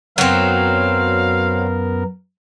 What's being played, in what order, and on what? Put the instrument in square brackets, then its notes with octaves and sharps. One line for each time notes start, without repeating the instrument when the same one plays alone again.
[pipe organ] F#2 B3 A#4 [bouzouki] F#3 C4 [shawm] F5